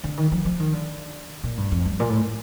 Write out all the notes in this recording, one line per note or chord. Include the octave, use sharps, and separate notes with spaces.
D3
D#3
F3
F3
D#3
D3
A#2
G2
F2
G2
A#2
A2